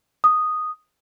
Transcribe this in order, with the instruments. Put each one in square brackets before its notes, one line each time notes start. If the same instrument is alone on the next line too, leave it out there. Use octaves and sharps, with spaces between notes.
[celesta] D#6